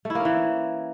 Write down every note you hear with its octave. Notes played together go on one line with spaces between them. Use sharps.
A3
E4
A#3
C#4
E3